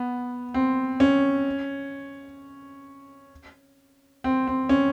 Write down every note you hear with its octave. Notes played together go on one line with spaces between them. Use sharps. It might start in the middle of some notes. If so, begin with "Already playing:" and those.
Already playing: B3
C4
C#4
C4
C4
C#4